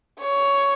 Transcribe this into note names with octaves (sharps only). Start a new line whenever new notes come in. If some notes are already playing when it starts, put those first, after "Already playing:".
C#5